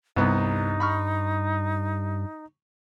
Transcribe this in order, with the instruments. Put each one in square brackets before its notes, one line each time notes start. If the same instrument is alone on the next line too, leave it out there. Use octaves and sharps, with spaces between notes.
[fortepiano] C2 B3 [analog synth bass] G2 [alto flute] D#4
[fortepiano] B5 C#6 F6